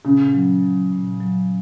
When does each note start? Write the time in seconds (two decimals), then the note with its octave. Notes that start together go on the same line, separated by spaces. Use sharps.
0.05 A#2 C#3
0.34 F#3
0.63 F#3
0.92 A#2
1.21 F#3